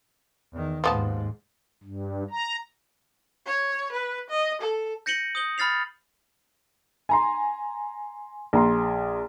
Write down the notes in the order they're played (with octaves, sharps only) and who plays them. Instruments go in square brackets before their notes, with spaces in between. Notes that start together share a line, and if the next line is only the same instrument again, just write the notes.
[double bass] E2 D#3
[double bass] D#2 G#2 [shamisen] F3 B3 A5
[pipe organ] G2
A#5
[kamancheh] C#5
B4
D#5
A4
[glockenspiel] G6 A#6 C#7 D#7 F#7 G7
D#6 G6 F#7 G7
B5 F6 A6 C7 F7
[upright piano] G#5 A#5 C6
A#1 A#5 C6